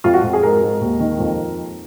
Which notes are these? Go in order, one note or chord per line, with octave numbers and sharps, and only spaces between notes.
F2 F4
F#4
F2
G#4
G#2 A#4
G#2
D#2
D#3
F2